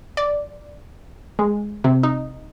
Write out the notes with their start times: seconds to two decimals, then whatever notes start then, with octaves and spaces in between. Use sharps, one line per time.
0.17 D5
1.39 G#3
1.84 C3
2.03 D#4